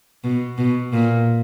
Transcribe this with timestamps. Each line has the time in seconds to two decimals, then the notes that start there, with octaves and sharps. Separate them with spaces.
0.24 B2
0.58 B2
0.93 A#2